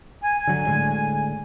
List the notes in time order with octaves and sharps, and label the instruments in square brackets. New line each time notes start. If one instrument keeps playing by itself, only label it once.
[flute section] G#5
[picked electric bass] D3 F#3
A2 D3 G#3